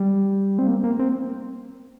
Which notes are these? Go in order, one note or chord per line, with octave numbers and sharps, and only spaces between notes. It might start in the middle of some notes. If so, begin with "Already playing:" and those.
Already playing: G3
C4
A#3
A#3
C4